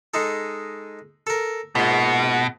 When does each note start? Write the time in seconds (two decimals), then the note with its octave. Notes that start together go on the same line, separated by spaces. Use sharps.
0.14 G#3 D#4 A4
1.27 A4 A#4
1.75 A#1 G#2 B2